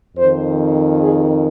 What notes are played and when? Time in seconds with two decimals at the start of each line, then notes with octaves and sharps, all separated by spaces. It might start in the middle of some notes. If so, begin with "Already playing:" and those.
0.17 F2 D#3 C5
1.01 G#4